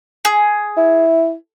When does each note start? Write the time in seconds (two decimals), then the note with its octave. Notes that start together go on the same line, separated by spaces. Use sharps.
0.25 G#4
0.77 E4